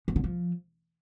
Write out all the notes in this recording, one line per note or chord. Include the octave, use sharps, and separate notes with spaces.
F3
D3
F3